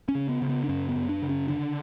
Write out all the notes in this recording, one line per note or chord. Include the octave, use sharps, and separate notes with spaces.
C#4
C#3
B3
C#3
B3
D4
F#2 C#4
B3
F#2
D4
C#3
C#4
D3 D4